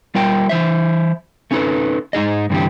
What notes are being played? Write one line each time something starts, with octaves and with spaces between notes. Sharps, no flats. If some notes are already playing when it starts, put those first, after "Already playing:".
G3 F4 A#4 G5
E3 C5 E5
A3 C#4 D#4 G#4 A4 B4
G#2 D#4 G#4 D#5
G2 D3 E3 D4 G4